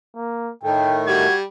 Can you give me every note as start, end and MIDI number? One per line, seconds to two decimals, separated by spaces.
0.16 0.51 58
0.63 1.27 45
0.63 1.27 51
0.63 1.27 57
0.63 0.99 79
1.07 1.43 55
1.07 1.34 66
1.07 1.35 92